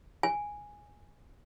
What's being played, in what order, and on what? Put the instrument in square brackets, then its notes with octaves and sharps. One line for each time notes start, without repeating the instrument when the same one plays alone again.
[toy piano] G#5